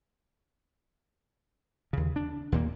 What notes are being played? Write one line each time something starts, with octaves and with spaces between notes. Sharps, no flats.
D#2 C#3
D4
D#2 A#2 A#3